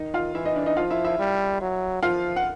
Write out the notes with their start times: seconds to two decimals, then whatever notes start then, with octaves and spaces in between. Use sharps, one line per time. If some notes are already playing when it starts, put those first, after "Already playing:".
Already playing: D#3 D#4 D#5
0.14 F4 F5
0.34 E3 E4 E5
0.45 D#4 D#5
0.56 D4 D5
0.66 D#4 D#5
0.77 F3 F4 F5
0.90 E4 E5
1.05 E4 E5
1.19 G3
1.61 F#3
2.02 F3 F4 F5
2.36 F#5